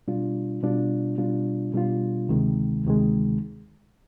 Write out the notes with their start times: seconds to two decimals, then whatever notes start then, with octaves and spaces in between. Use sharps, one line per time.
0.08 B2 G3 D4 F4
0.63 B2 G3 D4 F4
1.18 B2 G3 D4 F4
1.74 B2 G3 D4 F4
2.29 D2 C3 D#3 G#3
2.85 D2 C3 D#3 G#3